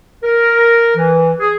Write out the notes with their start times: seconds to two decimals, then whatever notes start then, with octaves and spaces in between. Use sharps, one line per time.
0.23 A#4
0.97 E3
1.40 G#4